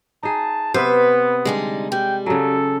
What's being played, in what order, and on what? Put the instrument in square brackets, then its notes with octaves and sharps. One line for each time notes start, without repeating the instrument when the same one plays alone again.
[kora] D#4 G#4 [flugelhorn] A5
[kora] C3 C5 E5 [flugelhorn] B3 [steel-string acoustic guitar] B4
[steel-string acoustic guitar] D3 G3 D#4 [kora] G#3
[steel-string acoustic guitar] G3 [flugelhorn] G5
[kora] C#3 F#3 [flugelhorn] A4